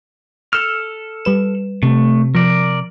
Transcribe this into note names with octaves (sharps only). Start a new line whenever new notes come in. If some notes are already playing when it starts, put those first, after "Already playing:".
A4 E6 F6
G3 B4 E7
C3 A3
F3 A#4 D5